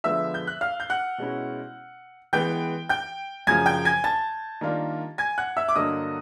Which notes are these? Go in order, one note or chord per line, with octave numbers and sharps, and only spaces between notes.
D3 F3 G#3 B3 E5 E6
G6
F#6
F5 F6
G6
F#5 F#6
B2 G#3 C#4 E4
E3 G#3 B3 G5 G6
G5 G6
F#2 C#3 F3 G#5 G#6
G5 G6
G#5 G#6
A5 A6
D#3 G3 A#3 D4 F4
G#5 G#6
F#5 F#6
E5 E6
D6
G2 D3 F#3 A#3 D#5 D#6